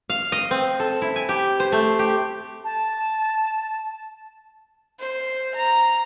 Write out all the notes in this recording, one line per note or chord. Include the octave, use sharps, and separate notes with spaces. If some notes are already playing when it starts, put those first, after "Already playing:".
F5
D#5
C4
A4
E4
G#5
G4
C5
A3
G4
A5
C5
A#5